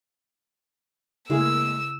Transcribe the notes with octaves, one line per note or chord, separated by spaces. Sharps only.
C#3 G#3 A#3 E4 G#4 E6